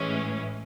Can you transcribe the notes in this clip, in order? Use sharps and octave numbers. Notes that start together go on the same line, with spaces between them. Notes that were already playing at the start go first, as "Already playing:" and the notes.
Already playing: A2 E3 G#3 C#4